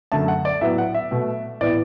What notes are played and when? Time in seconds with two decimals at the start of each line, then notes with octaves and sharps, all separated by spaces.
0.12 F#2 D3 A3 A5
0.28 F#5
0.45 D5
0.61 A2 F#3 B3 E5
0.78 F#5
0.94 E5
1.11 B2 A3
1.61 A2 E3 B3 D5